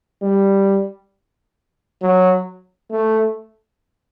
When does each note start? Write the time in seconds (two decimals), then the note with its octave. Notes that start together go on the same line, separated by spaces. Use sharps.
0.22 G3
2.02 F#3
2.91 A3